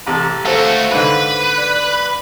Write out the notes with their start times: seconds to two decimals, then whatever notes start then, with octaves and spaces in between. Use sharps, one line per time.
0.07 A1 C3 A5 A#5 A6
0.45 A3 F#4 A4 C5 F5 F#5
0.92 G#2 D3 B4
1.58 D5